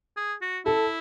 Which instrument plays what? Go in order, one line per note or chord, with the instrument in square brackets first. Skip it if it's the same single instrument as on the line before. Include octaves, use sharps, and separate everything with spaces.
[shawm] G#4
F#4
[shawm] E4 [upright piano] A4